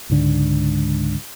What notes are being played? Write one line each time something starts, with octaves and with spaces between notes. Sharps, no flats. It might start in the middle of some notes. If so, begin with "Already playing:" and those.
C#2 G#2 D3